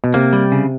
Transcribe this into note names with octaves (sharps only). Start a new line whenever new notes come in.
B2
C3 A#3
G3
C#3